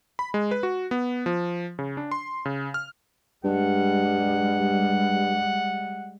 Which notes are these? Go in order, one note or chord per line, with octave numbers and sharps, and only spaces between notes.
B5
G#3
B4
F#4
B3
F3
C#3
D4
C6
C#3
F6
G2 G3 G#3 F#5